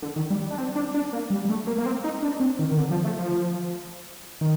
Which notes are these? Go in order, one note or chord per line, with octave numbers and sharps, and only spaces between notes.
D3
D#3
G3
D4
C4
D4
D4
A#3
G3
G3
A3
A#3
A#3
C4
D#4
D4
C4
D#3
D#3
D3
F3
A3
F3
D#3